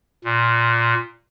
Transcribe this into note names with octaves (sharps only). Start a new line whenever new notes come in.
A#2